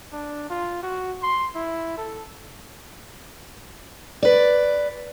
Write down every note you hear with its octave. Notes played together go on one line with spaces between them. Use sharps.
D4
F4
F#4
C6
E4
A4
B4 D5